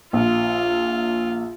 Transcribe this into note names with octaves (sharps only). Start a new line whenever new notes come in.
A#1 F4